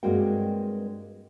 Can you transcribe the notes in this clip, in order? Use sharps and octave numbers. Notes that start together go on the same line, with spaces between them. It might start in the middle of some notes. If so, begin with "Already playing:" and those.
G2 G#3 A#3 C4 F#4 G5